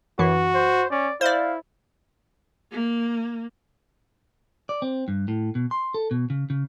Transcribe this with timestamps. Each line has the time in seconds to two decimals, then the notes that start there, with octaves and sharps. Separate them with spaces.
0.19 F#2 E3 F#4
0.54 C5
0.90 C#4 D5
1.21 E4 C5 D5 F5
2.71 A#3
4.69 D5
4.82 C4
5.08 G2
5.28 A2
5.55 B2
5.71 C6
5.94 A4
6.11 B2
6.30 C#3
6.50 C#3